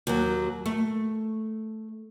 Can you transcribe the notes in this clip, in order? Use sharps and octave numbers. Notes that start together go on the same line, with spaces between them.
D#2 F#3
A3